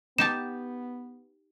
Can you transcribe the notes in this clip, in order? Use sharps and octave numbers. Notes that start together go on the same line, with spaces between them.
B3 D#4 G4 A5 E7